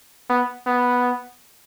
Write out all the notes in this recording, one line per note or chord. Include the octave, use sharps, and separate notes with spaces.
B3
B3